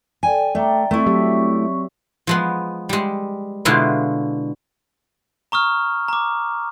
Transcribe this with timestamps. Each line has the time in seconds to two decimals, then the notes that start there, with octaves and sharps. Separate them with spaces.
0.23 A4 D5 G5 G#5
0.55 A3 D5 E5 G5 A#5
0.91 A3 C4 E4 C#6
1.06 F#3 G4 E5
2.27 F3 G#3 B3
2.89 G3 G#3
3.65 B2 D3 G#3 E4 F4
5.52 A#5 C#6 D#6 F6
6.08 A#5 D6